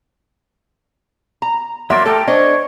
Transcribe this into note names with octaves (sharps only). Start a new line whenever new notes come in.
A#5
F#3 A#3 D5 E5 C6
A3 G4 A4 A#4 A5
D4 C5 C#5 D#5